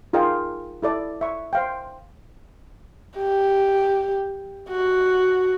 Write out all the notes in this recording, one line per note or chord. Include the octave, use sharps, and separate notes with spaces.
D#4 F4 G#4 A#4 D#5 G5
E4 A4 D5 D#5
E5 C#6
C5 F5 G5
G4
F#4